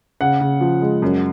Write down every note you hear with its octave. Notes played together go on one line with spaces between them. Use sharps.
C#3 F#5
C#3
F3
G#3
F#2